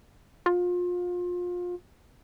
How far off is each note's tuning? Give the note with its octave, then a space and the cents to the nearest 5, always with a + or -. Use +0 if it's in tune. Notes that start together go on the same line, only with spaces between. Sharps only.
F4 +30